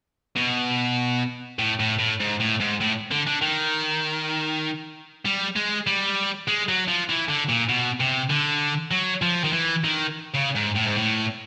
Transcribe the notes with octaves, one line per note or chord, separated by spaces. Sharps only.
B2
A2
A2
A2
G#2
A2
G#2
A2
D3
D3
D#3
G3
G#3
G3
G#3
F#3
F3
E3
D3
A#2
B2
C3
D3
F#3
F3
D#3
E3
D#3
C#3
G#2
A2
G#2
A2